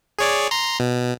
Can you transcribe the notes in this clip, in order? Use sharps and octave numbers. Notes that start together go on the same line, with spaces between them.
G#4 C#5 D5
A#5 C6
B2